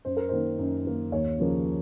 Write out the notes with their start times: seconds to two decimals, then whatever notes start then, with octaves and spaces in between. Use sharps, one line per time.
0.05 F#2 C5
0.17 A#4
0.29 D#3 A#3 C5
0.59 F#2
0.85 D#3 A#3
1.12 D#2 C#5
1.38 C#3 F3 A#3